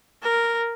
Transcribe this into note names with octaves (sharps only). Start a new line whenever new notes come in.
A#4